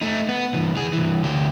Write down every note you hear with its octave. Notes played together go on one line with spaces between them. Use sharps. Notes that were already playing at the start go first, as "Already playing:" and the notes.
A3 D#4
B3
C2 E3
E3 G#4
C2 E3
D2 G4